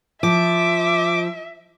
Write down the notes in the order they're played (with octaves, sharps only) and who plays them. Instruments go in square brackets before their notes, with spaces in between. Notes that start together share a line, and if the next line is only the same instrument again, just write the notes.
[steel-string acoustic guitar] F3 [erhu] E5 [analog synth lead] D6